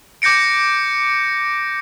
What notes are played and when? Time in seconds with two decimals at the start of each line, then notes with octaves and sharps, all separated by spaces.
0.22 D6 G6 A#6 C#7 D7